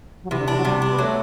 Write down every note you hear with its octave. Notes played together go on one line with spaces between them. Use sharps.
F#3
C3 E3
D3
E3 D4
F#3
C3 G3
D4
B3
F#3 A3